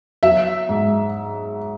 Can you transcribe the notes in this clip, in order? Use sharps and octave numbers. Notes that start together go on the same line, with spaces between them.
F#3 E5
G#2